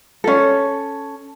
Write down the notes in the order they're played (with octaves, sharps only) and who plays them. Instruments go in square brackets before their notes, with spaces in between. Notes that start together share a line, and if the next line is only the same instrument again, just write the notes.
[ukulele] C#4 A4